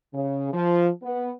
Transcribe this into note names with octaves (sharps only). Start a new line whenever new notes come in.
C#3
F3
B3